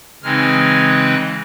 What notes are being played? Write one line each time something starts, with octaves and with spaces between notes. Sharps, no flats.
C#3 E3 G#3 C4 D#4 F6
F#6